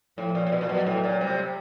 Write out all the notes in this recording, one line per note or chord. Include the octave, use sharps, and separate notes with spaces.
A2 F3
A#2
A#2
B2
A#2
B2 F#3
A2
A#2
C3 G3